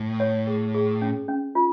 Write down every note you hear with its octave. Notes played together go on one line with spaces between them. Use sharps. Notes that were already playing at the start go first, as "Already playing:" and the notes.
Already playing: A2
C#5
G#4
G#4
C#4
C#4
F4